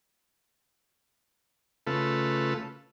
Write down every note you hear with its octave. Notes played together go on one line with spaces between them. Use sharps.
C#3 A3 F4 A4 B4